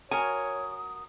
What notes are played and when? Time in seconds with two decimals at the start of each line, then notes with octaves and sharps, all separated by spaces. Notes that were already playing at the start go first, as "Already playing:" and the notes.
0.11 F#4 A#4 C#5 G#5 D#6